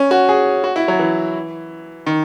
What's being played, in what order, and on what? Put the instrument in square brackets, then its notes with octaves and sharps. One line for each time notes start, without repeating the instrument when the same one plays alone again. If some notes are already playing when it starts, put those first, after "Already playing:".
Already playing: [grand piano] C#4
F#4
G#4
F#4
E4
F#3
E3
D#3